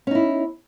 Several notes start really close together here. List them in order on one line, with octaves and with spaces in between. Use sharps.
C#4 D#4 E4